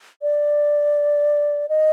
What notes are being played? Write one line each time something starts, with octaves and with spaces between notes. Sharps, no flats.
D5
D#5